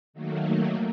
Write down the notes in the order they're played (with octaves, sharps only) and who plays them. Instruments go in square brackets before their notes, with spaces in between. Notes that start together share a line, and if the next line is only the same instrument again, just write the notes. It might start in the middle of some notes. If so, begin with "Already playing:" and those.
[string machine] D#3 F#3 A3 A#3